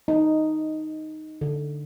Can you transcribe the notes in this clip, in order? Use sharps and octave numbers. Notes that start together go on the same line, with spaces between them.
D#4
D3